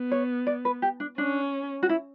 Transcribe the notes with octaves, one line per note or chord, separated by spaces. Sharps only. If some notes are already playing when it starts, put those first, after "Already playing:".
Already playing: B3
C#5
D5
B4
G4
D4
C#4 D4
F#4
E4